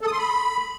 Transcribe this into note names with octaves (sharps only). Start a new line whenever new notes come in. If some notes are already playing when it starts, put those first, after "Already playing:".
A4
D#6
C6
B5